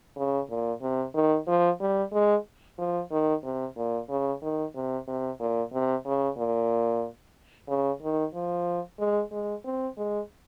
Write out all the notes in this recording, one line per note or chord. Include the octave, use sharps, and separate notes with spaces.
C#3
A#2
C3
D#3
F3
G3
G#3
F3
D#3
C3
A#2
C#3
D#3
C3
C3
A#2
C3
C#3
A#2
C#3
D#3
F3
G#3
G#3
C4
G#3